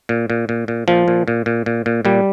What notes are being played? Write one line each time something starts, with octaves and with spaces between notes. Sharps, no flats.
A#2
A#2
A#2
A#2
A#2 F3
A#2
A#2
A#2
A#2
A#2
A#2 G3